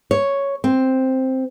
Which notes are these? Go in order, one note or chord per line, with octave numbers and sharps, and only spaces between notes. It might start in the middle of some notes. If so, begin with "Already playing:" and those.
C#5
C4